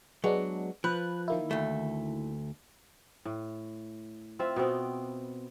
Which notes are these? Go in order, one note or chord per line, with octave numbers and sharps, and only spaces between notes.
F#3 G#3 B3 D4
F3 B4 F#6
D#3 A#3 E4
D2 A3
A2
C4 F4 E5
B2 B3 C4 G5